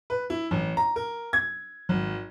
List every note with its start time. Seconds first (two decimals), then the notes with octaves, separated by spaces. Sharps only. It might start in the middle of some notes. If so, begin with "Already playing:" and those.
0.10 B4
0.30 E4
0.51 A1
0.77 A#5
0.96 A#4
1.33 G#6
1.89 G#1